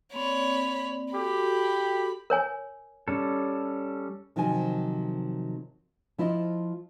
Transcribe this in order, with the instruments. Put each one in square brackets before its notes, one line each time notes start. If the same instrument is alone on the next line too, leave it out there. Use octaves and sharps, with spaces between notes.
[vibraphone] A#3 C4 D5 [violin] C#5 B5
[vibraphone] F#4 A4 [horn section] G4 [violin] B5
[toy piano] A#4 C#5 G#5
[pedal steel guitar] G3 C#4 A4
[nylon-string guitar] C3 D#3 F3 F#3 G#5
F3 E4 F4 D#5